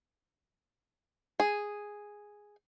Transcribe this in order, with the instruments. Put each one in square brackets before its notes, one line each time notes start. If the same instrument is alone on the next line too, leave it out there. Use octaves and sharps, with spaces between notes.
[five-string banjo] G#4